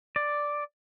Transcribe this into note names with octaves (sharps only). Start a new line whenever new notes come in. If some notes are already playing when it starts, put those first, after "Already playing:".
D5